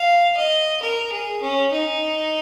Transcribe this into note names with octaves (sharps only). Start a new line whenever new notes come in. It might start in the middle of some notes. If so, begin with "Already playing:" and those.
Already playing: F5
D#5
A#4
G#4
C#4
D#4